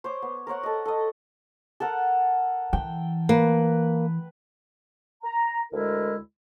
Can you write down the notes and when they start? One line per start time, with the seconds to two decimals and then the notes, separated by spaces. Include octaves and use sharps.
0.04 C5 C#5 D6
0.22 B3
0.47 A#4 C5 C#5 F#5
0.63 A4 D#5
0.85 A4 D#5
1.80 A4 A#4 F#5
2.73 E3 G5
3.29 A#3 B4
5.24 A#5
5.73 D2 G#3 E4 A#4